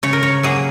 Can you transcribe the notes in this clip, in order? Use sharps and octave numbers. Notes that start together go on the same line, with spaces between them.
C#3 C#5
A#4
C#5
F#3 A#3 G#4